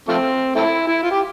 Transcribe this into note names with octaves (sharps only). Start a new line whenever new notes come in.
F3 A3 C4
A3 C4 E4
E4
F4
G4